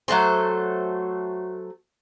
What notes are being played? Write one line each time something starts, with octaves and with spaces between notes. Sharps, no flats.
F#3 A3 A4 C5